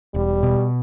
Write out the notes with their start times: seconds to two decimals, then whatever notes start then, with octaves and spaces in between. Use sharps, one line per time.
0.14 E1 G3
0.43 B2